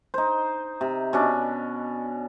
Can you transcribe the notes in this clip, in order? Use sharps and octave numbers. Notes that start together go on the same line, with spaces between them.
D#4 C5
C3
B2 C#4 D4